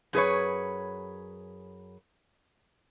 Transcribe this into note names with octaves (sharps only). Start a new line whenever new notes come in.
F#2 G#4 B4 C#5